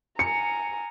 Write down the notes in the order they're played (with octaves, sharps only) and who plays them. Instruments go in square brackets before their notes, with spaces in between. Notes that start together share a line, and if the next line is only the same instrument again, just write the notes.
[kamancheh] G#5 A#5 [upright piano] C#7